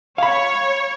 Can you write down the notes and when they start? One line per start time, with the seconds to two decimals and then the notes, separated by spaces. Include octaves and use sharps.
0.18 C#5 F5 B5